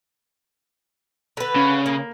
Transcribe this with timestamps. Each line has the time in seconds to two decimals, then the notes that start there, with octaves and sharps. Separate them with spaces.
1.37 D3 B4
1.56 C#3
1.86 A#3